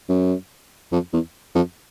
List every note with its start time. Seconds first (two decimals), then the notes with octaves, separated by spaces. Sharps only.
0.09 F#2
0.92 F2
1.13 E2
1.55 F2